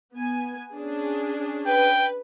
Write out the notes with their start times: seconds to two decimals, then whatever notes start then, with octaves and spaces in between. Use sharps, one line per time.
0.15 B3 G#5
0.74 C#4 D4 G#4
1.66 B4 G5